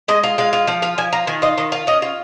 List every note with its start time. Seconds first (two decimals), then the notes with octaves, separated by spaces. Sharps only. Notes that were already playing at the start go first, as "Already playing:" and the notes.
0.08 G#3 D#5
0.24 F4
0.38 G#3 F5
0.53 F4
0.67 F3 F5
0.82 F4 F5
0.98 F3 G#5
1.13 F4 A#5
1.27 D#3 G#5
1.42 F4 D#5
1.57 D#3 D#5
1.72 F4 F5
1.87 C#4 D#5
2.02 F4